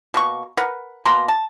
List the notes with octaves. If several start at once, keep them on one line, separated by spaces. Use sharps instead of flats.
B2 A#3 C#6
A#4 B4 F#5
B2 A#3 A#5 C6
A5